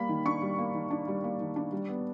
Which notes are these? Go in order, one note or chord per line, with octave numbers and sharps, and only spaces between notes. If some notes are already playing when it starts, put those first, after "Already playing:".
Already playing: G3 A#3 B5
D#3
D4 C#6
G3
A#3
D#3
D4
G3
A#3
D#3
D4
G3
B3